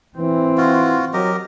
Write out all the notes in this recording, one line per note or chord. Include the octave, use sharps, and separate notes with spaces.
E3 C4
F4 F#4
F#3 G4 A#4 D#5